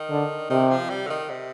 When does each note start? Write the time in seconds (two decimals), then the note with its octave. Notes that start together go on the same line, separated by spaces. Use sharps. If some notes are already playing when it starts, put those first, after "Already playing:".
Already playing: D#3
0.10 D3
0.50 C3 D#3
0.71 F3
0.90 G3
1.06 D3
1.10 D#3
1.30 C3